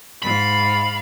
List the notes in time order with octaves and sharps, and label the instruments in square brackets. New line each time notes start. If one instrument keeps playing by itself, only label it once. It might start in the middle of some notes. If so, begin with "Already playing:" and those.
[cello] G#2 F5 [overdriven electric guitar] B5